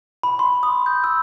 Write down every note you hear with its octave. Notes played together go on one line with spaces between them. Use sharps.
B5
C6
D#6
G6
E6